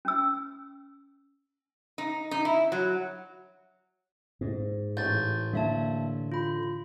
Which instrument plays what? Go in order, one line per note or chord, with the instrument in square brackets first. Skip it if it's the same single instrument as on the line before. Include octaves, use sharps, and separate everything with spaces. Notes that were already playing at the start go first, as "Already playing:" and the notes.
[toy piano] C#4 E6
[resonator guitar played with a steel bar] D#4
D#4
E4
F#3
[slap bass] G#2
[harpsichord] A1 [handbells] G6 A6
[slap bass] D3 [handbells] A#3 E5 A5
[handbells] F4 B5